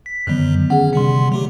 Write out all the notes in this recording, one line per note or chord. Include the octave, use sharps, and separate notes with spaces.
B6
F#2 D3 D#3 F#3 B3
C#4 G#4 F#5
C3 G3 C6
F#3 A3 G4